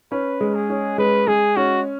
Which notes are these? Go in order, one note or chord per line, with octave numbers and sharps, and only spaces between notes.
C#4 B4
G#3
G#4
C#4
G#3 B4
G#3 G#4
C#4 F#4